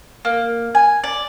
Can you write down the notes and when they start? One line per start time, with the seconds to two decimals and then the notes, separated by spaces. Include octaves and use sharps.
0.25 A#3
0.75 G#5
1.04 D5